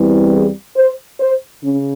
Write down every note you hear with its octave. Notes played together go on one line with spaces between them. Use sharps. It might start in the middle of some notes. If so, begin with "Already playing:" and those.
Already playing: E2 E3 G3 C4
G#4
C5
C5
C#3 C#4